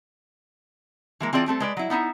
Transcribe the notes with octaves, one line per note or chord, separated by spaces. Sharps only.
E3 G#3 A#3
E3 C4 F4 G#4 D5 A5
G3 A3 C4 A4
G#3 B4 D5
F#3 E4
B3 D#4 E4 E5